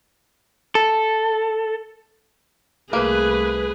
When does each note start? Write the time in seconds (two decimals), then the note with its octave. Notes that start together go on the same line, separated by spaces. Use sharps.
0.75 A4
2.93 C2 A3 A#3 G#4 B4